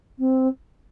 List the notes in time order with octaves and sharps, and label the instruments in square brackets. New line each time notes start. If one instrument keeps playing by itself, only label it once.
[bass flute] C4